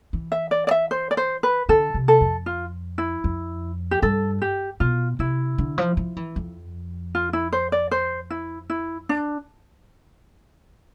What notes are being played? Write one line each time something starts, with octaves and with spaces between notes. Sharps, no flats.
E3
E5
D5
D5
E5
C5
D5
C5
B4
D3 A4
C3
A4
F2
F4
E4
F2
G4
G2 A4
G4
B2 F4
C3 E4
D3
F3
F3
E3
F2
F4
E4
C5
D5
C5
E4
E4
D4